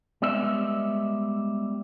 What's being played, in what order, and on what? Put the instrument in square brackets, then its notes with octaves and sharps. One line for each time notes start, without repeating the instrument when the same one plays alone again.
[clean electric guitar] G3 G#3 B3 D#5 E5